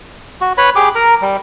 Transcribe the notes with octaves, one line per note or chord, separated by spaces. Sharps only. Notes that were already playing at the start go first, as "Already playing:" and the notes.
F#4
B4 C#5 B5
G4 G#4 D6
A#4 A#5
G3